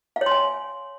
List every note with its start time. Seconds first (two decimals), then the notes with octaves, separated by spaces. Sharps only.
0.16 F5
0.21 C#5
0.26 C6
0.31 G#5